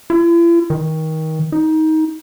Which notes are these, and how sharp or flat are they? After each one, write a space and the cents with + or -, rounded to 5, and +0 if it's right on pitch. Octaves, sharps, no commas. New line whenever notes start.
E4 +45
D#3 +25
D#4 +20